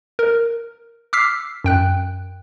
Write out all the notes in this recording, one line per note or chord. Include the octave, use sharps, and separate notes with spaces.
A#4
D6 E6 F6 B6 C7
F#2 G5 F#6